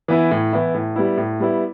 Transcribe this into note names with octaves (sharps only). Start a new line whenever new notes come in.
E3 B3 E4
A2
E3 B3 E4
A2
G3 B3 E4
A2
G3 B3 E4